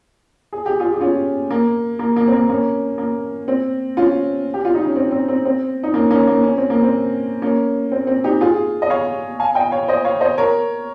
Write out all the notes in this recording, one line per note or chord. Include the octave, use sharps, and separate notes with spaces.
G#4
G4
F4 G#4
G4
C#4 F4
A#3
A#3
A#3
C4
A#3
A#3 C#4
A#3
C4
C#4 F4
G4
F4
D#4
C#4
C4
C4
C4
C4
D#4
A#3 C#4
A#3 C#4
A#3
C#4
C4
A#3
C4
A#3 C#4
C4
C4
D#4 G4
F4 G#4
D#5
C#5 F5
F5 G#5
D#5 G5
C#5 F5
C5 D#5
C#5 F5
C5 D#5
A#4 C#5